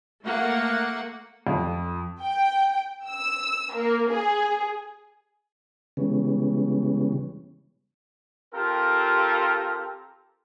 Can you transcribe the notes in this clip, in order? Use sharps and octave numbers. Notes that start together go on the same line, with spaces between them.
A3 A#3 F#5
F2
G5
E6
A#3
G#4
C#3 E3 G3 G#3 B3 C#4
C4 F4 G4 A4 A#4